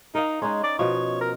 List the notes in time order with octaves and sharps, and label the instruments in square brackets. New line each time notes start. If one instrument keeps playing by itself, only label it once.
[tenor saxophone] D#4 [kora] A#4 F5
[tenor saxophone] G#3 [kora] C#4 D#4
[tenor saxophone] D5
[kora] B2 F3 [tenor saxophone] C#5
[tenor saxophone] A#4